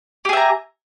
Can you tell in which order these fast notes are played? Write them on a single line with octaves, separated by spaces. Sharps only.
G4 G#4 E5 A#5